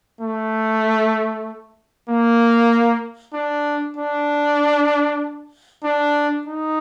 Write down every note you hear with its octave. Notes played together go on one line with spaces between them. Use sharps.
A3
A#3
D4
D4
D4
D#4